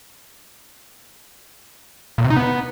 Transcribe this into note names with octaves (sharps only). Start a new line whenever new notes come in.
A#2
C3
D#4
B3